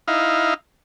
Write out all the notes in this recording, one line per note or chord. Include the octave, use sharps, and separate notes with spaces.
D#4 E4 F5